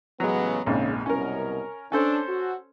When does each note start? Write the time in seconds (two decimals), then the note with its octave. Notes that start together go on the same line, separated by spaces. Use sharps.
0.20 A1 C#3 F#3 G#3 B3
0.66 A#1 F2 G#2 C#3
1.06 C2 F#2 B2 C#4 A#4
1.92 C#4 D4 A4 C5
2.28 F#4